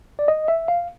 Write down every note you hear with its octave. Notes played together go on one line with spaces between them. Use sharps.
D5
D#5
E5
F5